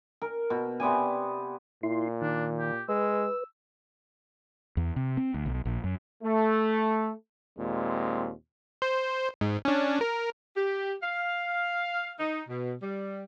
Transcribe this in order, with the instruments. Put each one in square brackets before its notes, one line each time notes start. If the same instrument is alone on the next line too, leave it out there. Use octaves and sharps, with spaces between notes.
[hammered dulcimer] A#4
B2
C3 B3 D5 G#5
[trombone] A#2 [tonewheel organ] E4 C6
[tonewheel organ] D#3 [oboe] D4
[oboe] G4
[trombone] G#3 [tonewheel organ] B4 [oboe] E6
[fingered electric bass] E2
C3
C4
D2
B1
A#1
F#2
[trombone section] A3
D#2 A#2 G#3 C4
[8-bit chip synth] C5
G#2
C#4 D4
A#4
[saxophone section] G4
F5
D#4
B2
G3